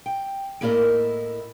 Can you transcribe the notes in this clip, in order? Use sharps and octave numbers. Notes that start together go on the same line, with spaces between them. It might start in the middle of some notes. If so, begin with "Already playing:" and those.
G5
A2 A#3 E4 A#4 D5 D#5